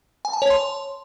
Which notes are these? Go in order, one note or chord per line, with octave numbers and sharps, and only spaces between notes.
G#5
A5
C#5
C6